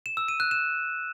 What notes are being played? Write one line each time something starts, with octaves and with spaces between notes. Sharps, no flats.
E7
E6
D#7
F#6
E7